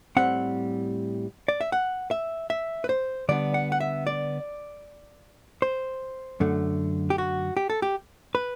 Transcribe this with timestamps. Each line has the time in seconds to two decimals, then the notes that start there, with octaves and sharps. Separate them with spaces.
0.17 A2 G3 C4 F#5
1.48 D5
1.61 E5
1.72 F#5
2.11 E5
2.50 E5
2.84 B4
2.89 C5
3.29 D3 G3 B3 D4 D5
3.54 F#5
3.72 F#5
3.80 E5
4.07 D5
5.62 C5
6.40 F#2 D3 A3
7.10 G4
7.18 F#4
7.57 G4
7.70 A4
7.82 G4
8.35 B4